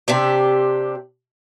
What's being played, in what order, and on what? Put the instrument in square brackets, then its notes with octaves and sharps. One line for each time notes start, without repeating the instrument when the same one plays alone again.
[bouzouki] C3 D4 G4